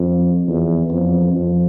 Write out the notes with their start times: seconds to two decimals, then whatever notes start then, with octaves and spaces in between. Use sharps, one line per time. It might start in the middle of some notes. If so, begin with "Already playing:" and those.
Already playing: F2
0.48 E2
0.91 F2
1.34 F2